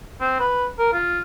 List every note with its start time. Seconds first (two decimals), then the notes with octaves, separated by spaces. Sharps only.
0.21 C4
0.40 B4
0.79 A#4
0.93 F4